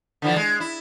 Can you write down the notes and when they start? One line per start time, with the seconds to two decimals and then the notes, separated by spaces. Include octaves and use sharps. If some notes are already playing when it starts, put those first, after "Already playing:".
0.22 D3 E3 F3
0.36 G#3
0.60 E4